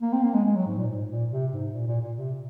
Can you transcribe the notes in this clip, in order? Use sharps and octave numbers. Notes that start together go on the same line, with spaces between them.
A#3
C4
A#3
G#3
G#3
F#3
G#2
A#2
G#2
A#2
C3
G#2
A#2
A#2
A#2
C3